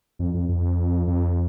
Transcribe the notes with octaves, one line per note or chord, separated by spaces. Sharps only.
F2
F2
F2
F2